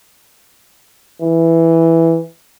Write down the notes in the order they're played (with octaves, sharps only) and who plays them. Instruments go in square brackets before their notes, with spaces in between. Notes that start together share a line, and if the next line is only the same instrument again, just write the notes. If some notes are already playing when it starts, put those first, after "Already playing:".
[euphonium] E3